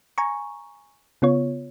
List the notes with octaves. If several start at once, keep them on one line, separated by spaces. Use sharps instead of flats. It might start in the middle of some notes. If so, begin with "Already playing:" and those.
G#5 A#5 C#6
C#3 B3 F4 C#5